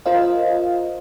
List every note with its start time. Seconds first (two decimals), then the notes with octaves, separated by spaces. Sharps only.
0.06 F4 A#4 C5 D#5 F5